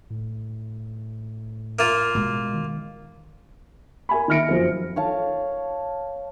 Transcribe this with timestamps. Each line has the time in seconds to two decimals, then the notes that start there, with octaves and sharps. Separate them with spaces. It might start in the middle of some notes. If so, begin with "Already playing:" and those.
0.10 A2
1.79 A#3 F4
2.15 B2 G#3
2.54 D#3
4.09 A#4 G#5 B5
4.28 D#3 E5 F6 A#6 C#7 D7
4.49 F#2 F3 C5
4.96 C#5 F5 A5